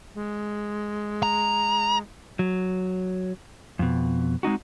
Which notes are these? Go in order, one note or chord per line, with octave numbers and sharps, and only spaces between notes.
G#3
A#5
F#3
F2 B2
G#3 C4 D#4 F#4